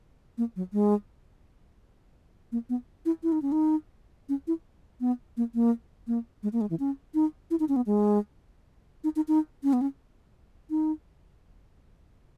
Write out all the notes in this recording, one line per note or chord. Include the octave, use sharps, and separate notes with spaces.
A#3
F#3
G#3
A#3
B3
E4
E4
D#4
C#4
D#4
C#4
E4
B3
A#3
A#3
A#3
G#3
A#3
G#3
E3
C#4
D#4
E4
D#4
C#4
B3
G#3
D#4
D#4
D#4
C#4
B3
C#4
D#4